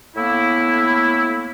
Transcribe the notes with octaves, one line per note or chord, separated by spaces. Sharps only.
A2 A#3 B3 E4